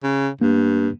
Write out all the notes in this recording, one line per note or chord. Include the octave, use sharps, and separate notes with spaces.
C#3
G2 A#3